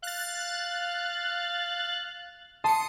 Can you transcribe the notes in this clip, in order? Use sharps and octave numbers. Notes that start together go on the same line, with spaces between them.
F5 F#6 A6
A5 C6 D#6 C#7